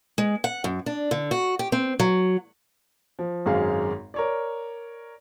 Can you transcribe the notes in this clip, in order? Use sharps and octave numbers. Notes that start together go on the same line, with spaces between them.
G#3
F#5
F#2
D4
D3
F#4
G4
C4
F#3
F3
G#1 F#2 G#3 G#4 F5
A#4 C#5 D5